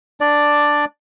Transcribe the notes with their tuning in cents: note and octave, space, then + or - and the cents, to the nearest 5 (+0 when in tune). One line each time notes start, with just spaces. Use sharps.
D4 +0 D5 +5